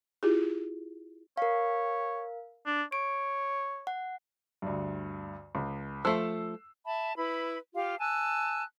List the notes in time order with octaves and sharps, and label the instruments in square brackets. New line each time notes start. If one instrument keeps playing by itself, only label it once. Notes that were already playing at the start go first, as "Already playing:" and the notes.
[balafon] E4 F4 G4 G#4
[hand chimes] A#4 F5 [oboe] C#5
[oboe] D4
[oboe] C#5 [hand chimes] D7
[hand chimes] F#5
[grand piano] D2 G2
C#2
[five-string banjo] F3 A3 [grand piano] E6 C7
[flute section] E5 A5 B5
E4 B4 B5
F4 G4 F5
G#5 A5 E6 F#6